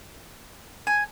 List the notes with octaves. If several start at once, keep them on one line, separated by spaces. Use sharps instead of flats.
G#5